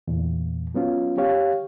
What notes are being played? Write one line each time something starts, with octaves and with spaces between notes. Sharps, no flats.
E2 A#2
F#3 B3 C#4 F4
G4 C#5 F5